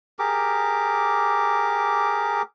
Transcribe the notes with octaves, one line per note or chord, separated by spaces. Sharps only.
G4 G#4 A#4 D6